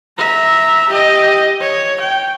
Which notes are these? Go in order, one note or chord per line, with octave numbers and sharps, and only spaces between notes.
E5 A#5
G4 D#5
C#5
G5